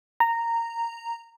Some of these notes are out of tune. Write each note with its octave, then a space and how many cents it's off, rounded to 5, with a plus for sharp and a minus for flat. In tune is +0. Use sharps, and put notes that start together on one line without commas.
A#5 -10